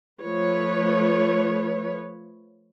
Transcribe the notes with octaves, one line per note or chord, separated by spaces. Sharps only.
F3 A3 B4 C#5